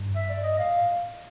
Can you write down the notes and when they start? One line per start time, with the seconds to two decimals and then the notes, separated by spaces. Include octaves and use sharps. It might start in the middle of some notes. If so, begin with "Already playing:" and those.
Already playing: G2
0.15 E5
0.29 D5
0.44 D#5
0.58 A2 F5